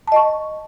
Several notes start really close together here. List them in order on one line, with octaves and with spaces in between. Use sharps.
A5 D#5 C#6